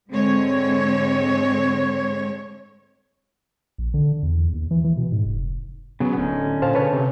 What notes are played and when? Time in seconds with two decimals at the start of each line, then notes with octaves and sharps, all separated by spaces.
0.10 G#2 D3 G#3 C4 C#5
3.78 A#1
3.94 D3
4.23 E2
4.53 D#2
4.71 E3
4.84 E3
4.97 B2
5.12 G#2
5.26 F1
6.00 C#3 F#3 B3
6.17 D1 D3 C#4 D#4
6.62 A#2 C5 F5 A5
6.75 C#3 B4 C#5 A5
6.93 C3